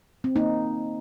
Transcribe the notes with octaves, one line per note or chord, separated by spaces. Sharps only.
C4
A#3 D#4